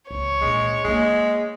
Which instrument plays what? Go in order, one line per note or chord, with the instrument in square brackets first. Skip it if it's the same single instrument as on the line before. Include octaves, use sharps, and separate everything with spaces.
[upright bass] C#2 [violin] C#5
[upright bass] A#1 D4 [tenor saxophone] G#3
[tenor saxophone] G#3 [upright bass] A#3 D4